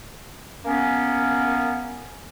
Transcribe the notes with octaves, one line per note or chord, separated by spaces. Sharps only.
A#3 B3 C#4